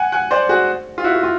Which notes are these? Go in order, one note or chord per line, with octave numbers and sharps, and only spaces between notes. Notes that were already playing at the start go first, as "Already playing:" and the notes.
Already playing: F#5 G#5
F#5 G#5
C5 D5
F#4 G#4
F4
E4 F#4
F#4
F4